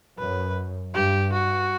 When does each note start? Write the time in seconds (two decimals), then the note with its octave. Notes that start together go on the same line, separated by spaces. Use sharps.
0.19 F#2 B4
0.94 G2 G4
1.33 F#4